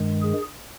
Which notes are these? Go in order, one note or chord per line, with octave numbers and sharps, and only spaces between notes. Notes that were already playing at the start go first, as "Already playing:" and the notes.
Already playing: G2 D#3 G#3
G#4